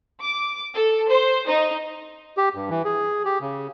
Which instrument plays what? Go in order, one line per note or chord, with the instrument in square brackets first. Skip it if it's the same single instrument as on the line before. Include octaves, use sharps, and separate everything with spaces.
[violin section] D6
A4
C5
D#4
[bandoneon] G4
G2
E3
G#4
G4
C#3